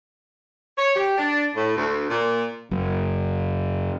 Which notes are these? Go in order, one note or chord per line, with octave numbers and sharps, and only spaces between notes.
C#5
G4
D4
A2
D2
A#2
F#1 F#2